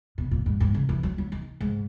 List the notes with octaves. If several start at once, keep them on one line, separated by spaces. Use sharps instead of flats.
B2
A#2
G#2
G#2
C#3
E3
F#3
F#3
D#3
G#2